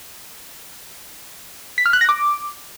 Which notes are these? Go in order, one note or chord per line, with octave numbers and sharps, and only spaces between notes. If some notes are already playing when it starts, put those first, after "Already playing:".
B6
F6
F#6
A#6
D6